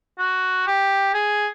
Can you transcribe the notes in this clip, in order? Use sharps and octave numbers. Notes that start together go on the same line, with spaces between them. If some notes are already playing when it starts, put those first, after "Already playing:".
F#4
G4
G#4